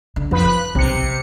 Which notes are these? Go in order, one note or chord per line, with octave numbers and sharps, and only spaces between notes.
D3
F2 F3 B4 B5
D#3 F#6
B1 C3 C#7
B3